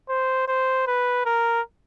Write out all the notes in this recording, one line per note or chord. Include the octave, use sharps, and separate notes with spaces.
C5
C5
B4
A#4